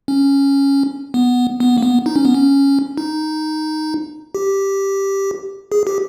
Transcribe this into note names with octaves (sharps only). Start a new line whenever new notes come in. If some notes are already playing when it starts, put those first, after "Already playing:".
C#4
B3
B3
A#3
B3
D#4
C#4
B3
C#4
D#4
G4
G#4
G4